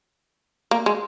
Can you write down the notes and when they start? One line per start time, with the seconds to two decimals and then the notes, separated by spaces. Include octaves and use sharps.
0.71 A#3
0.86 G#3